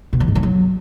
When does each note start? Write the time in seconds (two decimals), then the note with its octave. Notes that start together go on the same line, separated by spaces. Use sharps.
0.13 B2
0.20 E3
0.28 G#2
0.35 F3
0.43 F#3